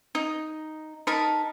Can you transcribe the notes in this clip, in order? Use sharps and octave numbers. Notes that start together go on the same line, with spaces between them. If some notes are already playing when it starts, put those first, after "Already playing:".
D#4
D#4 A#4 A5 B5